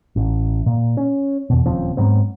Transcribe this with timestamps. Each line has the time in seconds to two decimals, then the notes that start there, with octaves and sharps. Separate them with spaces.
0.16 A1
0.66 A#2
0.97 C#4
1.50 E2 B2
1.66 D#1 C#3 F3 C4
1.97 G#2 F#3 B3 C4